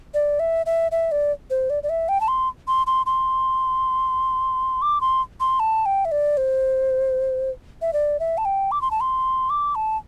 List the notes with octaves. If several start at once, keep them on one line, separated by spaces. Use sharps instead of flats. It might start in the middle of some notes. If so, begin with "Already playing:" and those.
D5
E5
E5
E5
D5
C5
D5
D5
E5
G5
A5
C6
C6
C6
C6
D6
C6
C6
A5
G5
E5
D5
C5
E5
D5
E5
A5
G5
D6
C6
A5
C6
D6
A5